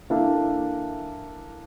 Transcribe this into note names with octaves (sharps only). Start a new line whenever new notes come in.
E3 A#3 D4 A4 E5